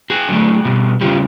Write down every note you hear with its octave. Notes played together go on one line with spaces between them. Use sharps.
F#4 G#4
D3 F#3 A3
B2 G3
C#3 E3 G3 F4 G4